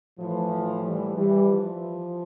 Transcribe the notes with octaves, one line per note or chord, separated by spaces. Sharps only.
A2 E3 F3
E3 G3
E3 G3
F3